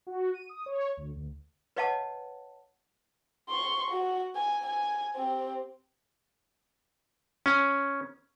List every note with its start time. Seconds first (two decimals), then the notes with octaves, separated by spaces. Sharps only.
0.07 F#4
0.34 D#7
0.49 D#6
0.66 C#5
0.97 D2
1.16 D2
1.76 B4 C#5 D#5 F5 F#5 A5
3.49 C6 C#6
3.91 F#4 F#5
4.35 G#5
4.66 G#5
5.16 C4 G4
7.46 C#4